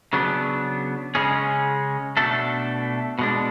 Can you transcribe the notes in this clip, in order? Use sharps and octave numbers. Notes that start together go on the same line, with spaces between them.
C#3 F#3 B3 D4
C#3 G#3 C#4 G#4
B2 A3 D4 A4
B2 G#3 D4